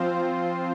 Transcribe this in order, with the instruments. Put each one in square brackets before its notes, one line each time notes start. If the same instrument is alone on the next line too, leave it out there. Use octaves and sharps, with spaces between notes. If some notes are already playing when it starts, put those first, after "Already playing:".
Already playing: [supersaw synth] F3 C4 F4 C5